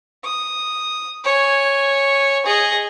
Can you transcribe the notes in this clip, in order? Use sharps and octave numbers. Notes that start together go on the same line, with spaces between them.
D#6
C#5 G#5
G#4 D#5